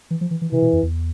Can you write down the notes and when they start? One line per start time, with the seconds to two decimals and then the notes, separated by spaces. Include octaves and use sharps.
0.11 E3
0.21 F3
0.31 E3
0.42 E3
0.52 C3 E3
0.62 B2
0.73 F2
0.83 E2